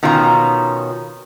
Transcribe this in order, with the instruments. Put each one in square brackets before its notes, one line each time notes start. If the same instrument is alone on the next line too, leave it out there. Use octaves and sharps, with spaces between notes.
[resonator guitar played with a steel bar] B2 D#3 C#4 F4 A#5